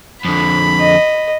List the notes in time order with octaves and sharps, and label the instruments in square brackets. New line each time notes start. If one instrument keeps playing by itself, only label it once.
[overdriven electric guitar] F2 D3 [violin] B5
[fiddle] D#5